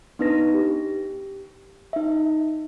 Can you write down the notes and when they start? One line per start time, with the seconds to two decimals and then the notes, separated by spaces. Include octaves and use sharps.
0.19 B3 D4 D#4 B4 A#6
0.54 G4
1.93 D#4 E5